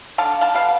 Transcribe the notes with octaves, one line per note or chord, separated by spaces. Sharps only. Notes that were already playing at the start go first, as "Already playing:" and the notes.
D3 F5 A5
F5 A5
G3 B3 F5